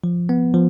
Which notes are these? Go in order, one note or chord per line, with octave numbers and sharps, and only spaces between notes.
F3
B3
F3